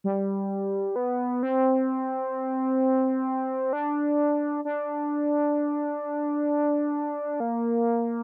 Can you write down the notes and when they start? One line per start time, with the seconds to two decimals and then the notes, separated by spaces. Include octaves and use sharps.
0.04 G3
0.96 B3
1.43 C4
3.73 D4
4.65 D4
7.40 A#3